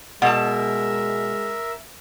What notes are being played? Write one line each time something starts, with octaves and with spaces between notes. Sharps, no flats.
B2 G#3 A#4 E5 F#5 A5